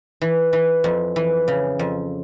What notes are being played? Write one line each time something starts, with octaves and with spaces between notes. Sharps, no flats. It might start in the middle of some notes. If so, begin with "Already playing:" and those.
E3
E3
F2
E3
C#3
F2